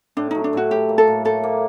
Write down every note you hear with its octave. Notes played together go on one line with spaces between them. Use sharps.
A2 D4
F#3 D#4
D4
A2 F#4
A2 G4
A#3
A4
A2
A2 A4
A#3